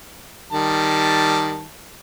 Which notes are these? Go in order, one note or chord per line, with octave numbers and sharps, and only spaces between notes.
D#3 G3 A5